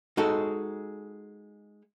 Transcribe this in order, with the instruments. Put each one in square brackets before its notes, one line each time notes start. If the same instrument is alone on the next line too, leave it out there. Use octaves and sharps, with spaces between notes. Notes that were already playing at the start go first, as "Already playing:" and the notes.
[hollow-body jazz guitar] G#3 D#4 F#4 A4